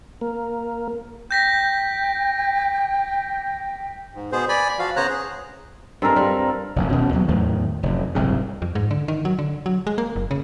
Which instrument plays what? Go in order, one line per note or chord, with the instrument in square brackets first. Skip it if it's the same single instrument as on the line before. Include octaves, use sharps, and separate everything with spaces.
[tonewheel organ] A#3
[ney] G5 [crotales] G6 A#6 B6
[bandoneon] G#2
B2 B3 G#4 C5
D5 G#5 B5
F3 F#4 F5
C#3 B3 C5 C#5 A#5 F#6
G#4
[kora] G2 G#3 [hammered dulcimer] C4 A4 A#4
[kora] G3 [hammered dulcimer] F4
[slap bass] F1 A#1 F#2
D#1 B2 C#4
D#2 F#3 B3
E2 A2 D#3 F#3
F1 F#2
F#1 C2 G#2 C#3
[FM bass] F2
G#2
D3
D#3
F#3
D3
F#3
G#3
A#3
F#1
C#3